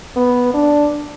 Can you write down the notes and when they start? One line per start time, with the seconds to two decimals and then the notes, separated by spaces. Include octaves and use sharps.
0.16 B3
0.54 D4